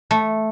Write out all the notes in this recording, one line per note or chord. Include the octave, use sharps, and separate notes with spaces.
A3